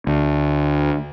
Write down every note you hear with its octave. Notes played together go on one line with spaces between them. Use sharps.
D2